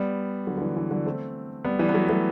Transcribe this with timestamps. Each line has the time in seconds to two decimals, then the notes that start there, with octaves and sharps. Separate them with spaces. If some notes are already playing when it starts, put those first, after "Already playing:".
Already playing: G3 B3
0.47 D3 F#3
0.57 D3
0.62 E3
0.77 E3
0.91 D3 F#3
1.06 A3 C4
1.65 G3 B3
1.79 E3 G3
1.89 B3
1.94 F#3 A3
2.09 F#3 A3